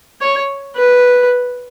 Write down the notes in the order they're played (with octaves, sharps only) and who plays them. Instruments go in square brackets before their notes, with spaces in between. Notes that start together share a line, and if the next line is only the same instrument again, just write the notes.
[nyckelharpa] C#5
B4